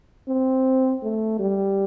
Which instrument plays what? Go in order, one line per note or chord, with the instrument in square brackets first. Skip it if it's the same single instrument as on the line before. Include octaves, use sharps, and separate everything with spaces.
[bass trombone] C4
A3
G3